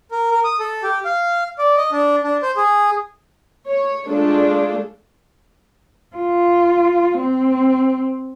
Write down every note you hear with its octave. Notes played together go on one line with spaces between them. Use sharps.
A#4
A#4
D#6
A4
G4
F5
D5
D#5
D4
D4
C5
G#4
C#5
G#3 A3 D4 F4 G#4 A4
F4
C4